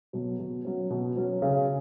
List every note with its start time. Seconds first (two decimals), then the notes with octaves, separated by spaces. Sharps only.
0.13 B2 F#3
0.39 B2
0.65 F#3 C#4
0.90 B2
1.16 F#3 C#4
1.42 C#3